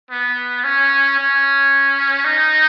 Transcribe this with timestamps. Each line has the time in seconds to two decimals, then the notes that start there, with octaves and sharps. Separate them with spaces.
0.11 B3
0.64 C#4
1.18 C#4
2.25 D#4